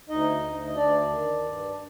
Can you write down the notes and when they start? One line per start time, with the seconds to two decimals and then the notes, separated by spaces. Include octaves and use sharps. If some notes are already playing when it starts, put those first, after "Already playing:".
0.09 D2 D#4 D#5
0.43 D2
0.67 D#5
0.76 D2 D4 D5
1.09 D#3
1.43 G2